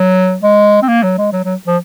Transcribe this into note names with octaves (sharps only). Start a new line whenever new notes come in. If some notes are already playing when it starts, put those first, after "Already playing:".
Already playing: F#3
G#3
C4
A#3
F#3
G#3
F#3
F#3
F3